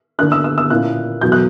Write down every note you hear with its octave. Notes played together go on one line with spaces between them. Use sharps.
D3 A#3 D4 F#6
E6
E6
E6
A#2 A#3 C#4 E4 F#6
E2 B2 F#3 G6
F#6